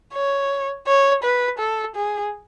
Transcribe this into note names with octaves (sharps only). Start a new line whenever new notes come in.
C#5
C#5
B4
A4
G#4